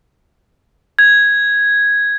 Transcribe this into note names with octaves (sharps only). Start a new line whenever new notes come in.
G#6